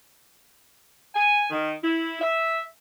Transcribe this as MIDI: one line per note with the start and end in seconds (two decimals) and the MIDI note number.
1.14 1.45 80
1.51 1.72 51
1.82 2.17 64
2.21 2.59 76